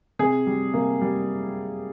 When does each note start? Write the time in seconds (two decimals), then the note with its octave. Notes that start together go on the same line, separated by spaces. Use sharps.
0.19 C3 G#4
0.47 G3
0.73 C3 A#3
1.01 G3